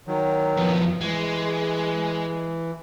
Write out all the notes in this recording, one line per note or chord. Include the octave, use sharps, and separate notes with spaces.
D#3 F#3
F2 B3
E3 G#3